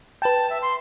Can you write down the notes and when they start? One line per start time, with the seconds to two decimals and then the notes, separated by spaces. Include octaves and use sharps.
0.22 B4 G5 A5
0.50 E5
0.62 C6